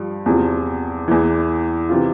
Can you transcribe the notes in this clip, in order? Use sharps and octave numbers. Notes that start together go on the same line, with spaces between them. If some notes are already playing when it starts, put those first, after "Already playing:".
Already playing: G2 F3
E2 C3 F3
E2 E3
C3 E3 F4